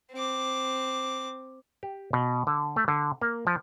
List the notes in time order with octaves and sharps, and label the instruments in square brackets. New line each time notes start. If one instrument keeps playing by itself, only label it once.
[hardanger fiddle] C4 D6
[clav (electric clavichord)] G4
B2
D3
A3
D3
A#3
F3